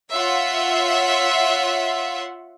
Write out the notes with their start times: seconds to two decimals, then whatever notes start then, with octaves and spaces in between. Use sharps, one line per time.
0.12 F4 C#5 E5 F#5 C6